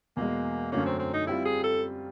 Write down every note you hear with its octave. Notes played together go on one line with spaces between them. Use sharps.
E2 B2 G#3 A#3
F#2 D3 F#3 A3 A#3 C#4
C4
C4
D#4
G3 C4 E4 F4
G#4
A4